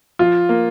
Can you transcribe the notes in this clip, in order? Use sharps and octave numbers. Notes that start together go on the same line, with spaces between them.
F3 F4
A#3